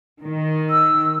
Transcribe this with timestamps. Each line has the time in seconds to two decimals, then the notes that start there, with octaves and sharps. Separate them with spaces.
0.24 D#3
0.70 E6